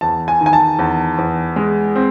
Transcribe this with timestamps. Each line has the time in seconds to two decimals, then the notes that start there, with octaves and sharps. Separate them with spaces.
0.01 E2 A5
0.28 G#5
0.41 D#3
0.46 G#5
0.53 A5
0.79 E2
1.18 E2
1.56 G#3
1.96 C4